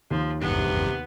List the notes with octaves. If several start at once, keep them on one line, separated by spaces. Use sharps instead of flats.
D#2 F3
A1 E2 G2 C3 B3